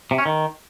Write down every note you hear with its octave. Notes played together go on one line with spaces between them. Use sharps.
C3
C#4
D#3